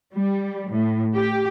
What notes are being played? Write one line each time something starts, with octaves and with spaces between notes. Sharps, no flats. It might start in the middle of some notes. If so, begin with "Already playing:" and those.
G3
A2
G4